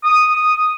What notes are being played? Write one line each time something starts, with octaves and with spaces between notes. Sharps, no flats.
D#6